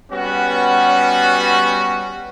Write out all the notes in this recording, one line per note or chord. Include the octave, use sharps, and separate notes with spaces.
G3 B3 C#4 F#4